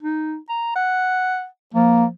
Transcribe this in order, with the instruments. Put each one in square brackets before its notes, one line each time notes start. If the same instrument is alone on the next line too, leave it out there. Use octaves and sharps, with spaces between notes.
[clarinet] D#4
A#5
F#5
[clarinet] F3 [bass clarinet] A#3